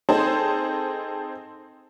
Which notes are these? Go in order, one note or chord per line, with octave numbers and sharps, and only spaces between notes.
C4 D#4 G#4 A4 C5